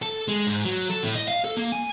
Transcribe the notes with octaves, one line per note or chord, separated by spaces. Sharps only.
A4
G#3
G#2
F#3
A4
A2
D#5
F5
A4
A#3
G#5